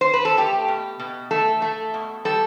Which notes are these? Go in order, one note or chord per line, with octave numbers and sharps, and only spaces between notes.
C5
B4
A4
A3 G4
B2
B2
A3 A4
A3
B2
G3 A4